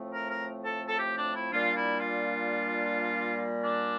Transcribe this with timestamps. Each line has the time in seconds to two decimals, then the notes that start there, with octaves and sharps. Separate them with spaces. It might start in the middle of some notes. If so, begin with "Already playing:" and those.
Already playing: A2 F3 A3 C4
0.11 A#4
0.29 A#4
0.64 A4
0.87 A4
0.98 G4
1.17 D4
1.34 E4
1.52 A#2 G3 A#3 D4 F4
1.75 E4
1.99 F4
3.62 D4